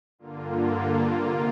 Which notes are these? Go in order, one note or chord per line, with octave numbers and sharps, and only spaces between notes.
G2 D3 A#3 F4
C3 A#3 F4